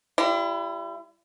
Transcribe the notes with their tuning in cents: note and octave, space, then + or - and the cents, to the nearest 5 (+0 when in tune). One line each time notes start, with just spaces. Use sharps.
G3 -5 E4 +40